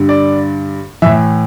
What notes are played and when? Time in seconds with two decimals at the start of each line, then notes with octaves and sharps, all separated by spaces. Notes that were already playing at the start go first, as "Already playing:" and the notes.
Already playing: G2 D3
0.09 D5
1.02 A2 E3 E5